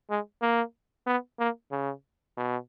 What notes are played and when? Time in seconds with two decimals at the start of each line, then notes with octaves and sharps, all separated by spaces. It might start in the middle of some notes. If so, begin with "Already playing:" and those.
0.10 G#3
0.42 A#3
1.07 B3
1.39 A#3
1.72 C#3
2.37 B2